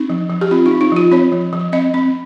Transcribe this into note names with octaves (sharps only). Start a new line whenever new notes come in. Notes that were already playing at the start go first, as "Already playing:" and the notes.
Already playing: C4 D#4
F3
F3
G4
C4 F4
D#4
C4
D#4
F3 F4
C4 C#5
F3
F3
C4 D#5
C4